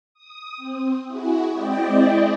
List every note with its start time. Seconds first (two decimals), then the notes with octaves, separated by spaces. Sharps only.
0.14 D#6
0.57 C4
1.08 E4 F#4 G#4
1.50 G#3 C4 E4 D5 D#5 G5